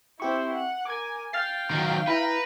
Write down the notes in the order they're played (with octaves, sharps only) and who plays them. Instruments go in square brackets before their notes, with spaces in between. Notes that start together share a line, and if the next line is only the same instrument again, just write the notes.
[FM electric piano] C4 G4 C#6 [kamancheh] E4 C5
[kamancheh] F#5
[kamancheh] A#4 G#5 [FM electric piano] D6 G#6
[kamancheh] F5 G5 [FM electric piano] F6 A6 C7
[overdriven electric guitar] D#3 F#3
[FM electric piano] E4 [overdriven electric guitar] B4 [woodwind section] A#5